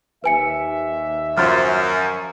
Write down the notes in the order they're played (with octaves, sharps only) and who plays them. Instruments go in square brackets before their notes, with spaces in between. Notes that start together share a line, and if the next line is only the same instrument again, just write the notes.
[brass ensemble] D#2 E5 [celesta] B4 G#5 C#7
[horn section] F#2 [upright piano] F3 C5 [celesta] F6 A6